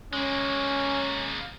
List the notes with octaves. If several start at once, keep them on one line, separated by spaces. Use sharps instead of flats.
G#3 A#3 C#4